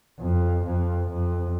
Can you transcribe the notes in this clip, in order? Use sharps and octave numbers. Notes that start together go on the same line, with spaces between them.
F2
F2
F2